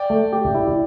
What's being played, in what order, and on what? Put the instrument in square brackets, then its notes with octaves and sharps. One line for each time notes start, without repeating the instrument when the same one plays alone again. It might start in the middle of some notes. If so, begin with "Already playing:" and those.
Already playing: [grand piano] D5 G5
[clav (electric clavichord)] A3
G4
E4